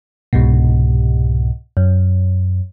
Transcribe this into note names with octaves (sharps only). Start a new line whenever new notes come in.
C2 G#2 B2
F#2